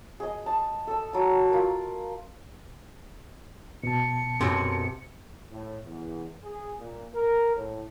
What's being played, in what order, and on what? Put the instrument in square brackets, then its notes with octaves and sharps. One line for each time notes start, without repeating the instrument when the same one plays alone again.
[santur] G#4 D#5
A5
A4 E6
F#3 A5
F4 A#4
[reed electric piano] B2 A5 [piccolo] C#7
[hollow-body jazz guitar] B1 F#2 C3
[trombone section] A2
E2
G#4
A#2
A#4
A2